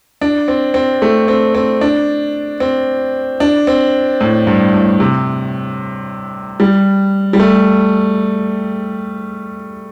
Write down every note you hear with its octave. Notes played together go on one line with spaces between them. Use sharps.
D4
C4
C4
A3
C4
C4
D4
C4
D4
C4
A2
G2
A2
C3
G3
G3
A3